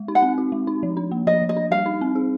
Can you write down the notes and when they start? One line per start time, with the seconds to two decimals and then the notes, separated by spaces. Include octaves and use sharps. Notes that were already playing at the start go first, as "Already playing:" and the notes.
Already playing: G#3
0.08 D#4
0.15 F#5
0.22 C4
0.38 F#4
0.52 G#3
0.67 D#4
0.83 F3
0.97 D4
1.11 A#3
1.27 F3 D#5
1.42 F3
1.49 D#5
1.57 D4
1.71 G3 F5
1.86 D#4
2.01 C4
2.15 G#4